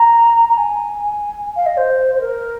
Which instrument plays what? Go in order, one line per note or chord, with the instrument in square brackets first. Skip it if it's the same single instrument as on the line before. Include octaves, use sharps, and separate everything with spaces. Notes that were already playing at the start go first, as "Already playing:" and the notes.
Already playing: [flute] A#5
A#5
G#5
F5
D#5
C5
C5
A#4